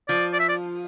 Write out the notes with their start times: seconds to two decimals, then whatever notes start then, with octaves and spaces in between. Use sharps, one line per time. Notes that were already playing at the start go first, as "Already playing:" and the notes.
0.08 F3 D5
0.33 D5
0.40 E5
0.49 D5